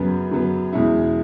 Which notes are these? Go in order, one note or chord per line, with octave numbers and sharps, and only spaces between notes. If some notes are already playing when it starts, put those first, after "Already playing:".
Already playing: F#2 C#3 F#3 B3
F#2 C#3 F#3 B3
E2 B2 G#3 C#4 E4